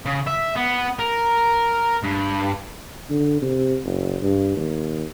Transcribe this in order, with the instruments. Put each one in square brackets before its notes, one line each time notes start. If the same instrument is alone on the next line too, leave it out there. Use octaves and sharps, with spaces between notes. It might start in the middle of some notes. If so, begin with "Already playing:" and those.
[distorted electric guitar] C#3
E5
B3
A#4
G2
[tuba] D3
C3
F#1
G2
D#2